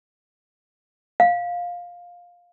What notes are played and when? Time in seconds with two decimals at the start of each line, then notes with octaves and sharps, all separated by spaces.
1.20 F5